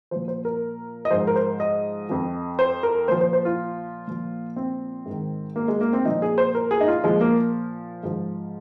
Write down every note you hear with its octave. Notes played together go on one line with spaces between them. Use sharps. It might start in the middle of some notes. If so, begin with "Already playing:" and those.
A#2 F3 C5
C5
A#4
D#5
G#2 F3 C5
A#4
C5
D#5
F2 F3
C5
A#4
A#2 F3 C5
C5
C5
F4
A#2 F3
C4
G#2 D#3
A#3
G#3
A#3
C4
A#2 F3 D#4
G#4
C5
A#4
G#4
D#4
F4
A#2 F3 G#3
A#3
G#2 F3